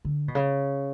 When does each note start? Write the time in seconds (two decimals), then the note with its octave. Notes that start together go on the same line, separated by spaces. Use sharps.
0.05 D3
0.28 B2
0.35 C#3